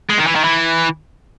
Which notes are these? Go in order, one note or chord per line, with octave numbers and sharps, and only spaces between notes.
G#3
D#3
E3
D#3
E3